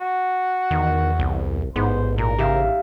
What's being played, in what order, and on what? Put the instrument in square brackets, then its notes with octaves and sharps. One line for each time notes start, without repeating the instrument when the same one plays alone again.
[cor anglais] F#4
[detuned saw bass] E2 [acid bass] D#3
[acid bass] C2
[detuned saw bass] A1 [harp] G#2 [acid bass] B3 [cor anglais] C5
[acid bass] A#2 [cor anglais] A#4
[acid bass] C#3 [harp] G4 E5 F5